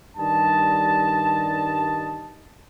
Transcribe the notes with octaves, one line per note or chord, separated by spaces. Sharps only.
G2 D#3 G3 D#5 A5